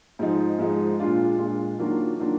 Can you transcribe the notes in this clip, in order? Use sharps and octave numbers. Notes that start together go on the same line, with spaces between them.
G#2 F3 G#3 D#4
G#2 F3 G#3 D#4
A#2 G#3 D4 F4
A#2 G#3 D4 F4
D#3 F#3 A#3 D4 F4
D#3 F#3 A#3 D4 F4